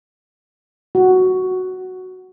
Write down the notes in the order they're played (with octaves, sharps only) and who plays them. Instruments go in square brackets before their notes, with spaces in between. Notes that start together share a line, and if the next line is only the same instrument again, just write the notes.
[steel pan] F#4